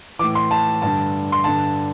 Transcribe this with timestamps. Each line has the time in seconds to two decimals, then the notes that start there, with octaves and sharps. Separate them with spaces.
0.19 E3 D6
0.23 A2
0.35 C6
0.51 A5
0.82 G2 D3 A5
1.32 C6
1.44 G2 D3 A5